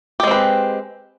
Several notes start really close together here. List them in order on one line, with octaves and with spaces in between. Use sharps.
G4 G#3 C4 B4